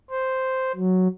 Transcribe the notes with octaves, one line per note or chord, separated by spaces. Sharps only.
C5
F#3